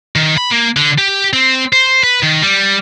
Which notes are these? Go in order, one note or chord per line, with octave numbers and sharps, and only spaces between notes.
D#3
B5
A#3
D3
G4
C4
C5
B4
D#3
G3